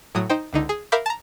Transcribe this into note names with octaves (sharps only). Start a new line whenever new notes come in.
A2 F#3 D#6
D#4 C5 G5
C#2 D3 D#4
G#4
A#4 E5 F5 B5 D6 G6
A5 A#5